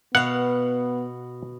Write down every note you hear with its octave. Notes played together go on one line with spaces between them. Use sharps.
B2 B3 F5 F#5